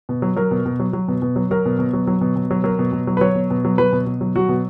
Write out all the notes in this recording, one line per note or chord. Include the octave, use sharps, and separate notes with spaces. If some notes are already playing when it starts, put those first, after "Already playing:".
B2
F#3
F#3 A#4
B2
B2
F#3
F#3
B2
B2
F#3
F#3 A#4
B2
B2
F#3
F#3
B2
B2
F#3
F#3 A#4
B2
B2
F#3
B4
F#3 C#5
B2
B2
F#3
F#3 B4
B2
B2
F#3
F#3 F#4
B2